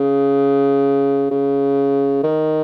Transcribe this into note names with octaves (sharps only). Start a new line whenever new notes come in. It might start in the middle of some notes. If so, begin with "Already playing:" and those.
Already playing: C#3
C#3
D#3